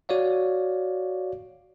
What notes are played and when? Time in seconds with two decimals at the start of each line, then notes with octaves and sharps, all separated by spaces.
0.09 F#4 C#5 D5 F5